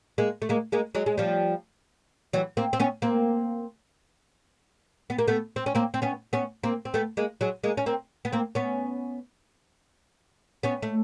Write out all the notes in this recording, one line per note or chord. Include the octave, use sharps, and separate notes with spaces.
G#3 A#3
A3
G#3 A#3
G#3 A#3
F#3 G#3
G#3
F3 G3
E3 F#3
A#3 C4
C4
B3 C#4
A#3 C4
B3
A#3
A3 B3
C4
C#4
A#3 C4
C4
B3 C#4
B3 C#4
A#3 C4
C4
A3 B3
G#3 A#3
F#3 G#3
G#3 A#3
C#4
A#3 C4
B3
A#3 C4
B3 C#4
B3 C#4
A3